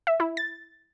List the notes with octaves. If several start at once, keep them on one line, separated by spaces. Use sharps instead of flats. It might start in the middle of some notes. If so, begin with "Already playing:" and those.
E5
E4
A6